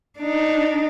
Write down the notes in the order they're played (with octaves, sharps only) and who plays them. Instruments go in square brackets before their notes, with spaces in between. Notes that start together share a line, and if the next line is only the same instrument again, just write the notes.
[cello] D4 D#4